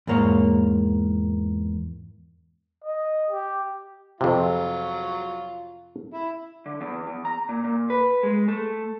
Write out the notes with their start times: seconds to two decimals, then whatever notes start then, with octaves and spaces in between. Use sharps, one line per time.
0.07 E2 G#2 A#3 C#5 F5
2.84 D#5
3.30 G4
4.21 F2 C3 F#3 F4
6.14 E4
6.66 D3
6.81 E2
7.07 E2
7.25 A#5
7.49 A#2
7.64 A#2
7.90 B4
8.23 G#3
8.48 A3